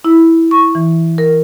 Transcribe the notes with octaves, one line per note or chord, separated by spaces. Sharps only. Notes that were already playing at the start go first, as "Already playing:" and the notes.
E4
C#6
E3
A#4